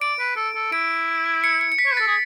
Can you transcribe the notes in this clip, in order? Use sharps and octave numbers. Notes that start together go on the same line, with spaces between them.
D5 D7
B4
A4
A4
E4 D7
C#7
C#7
C#7
B6
C#5
B4
A4 A6
G#4